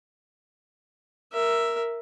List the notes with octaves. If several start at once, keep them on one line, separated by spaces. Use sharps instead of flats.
A#4 E5